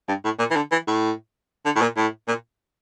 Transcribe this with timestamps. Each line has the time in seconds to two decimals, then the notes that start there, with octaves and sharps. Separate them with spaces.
0.08 G2
0.24 A2
0.39 A#2
0.51 E3
0.56 D3
0.72 E3
0.87 A2
1.65 D3
1.76 A2
1.82 A#2
1.97 A2
2.28 A#2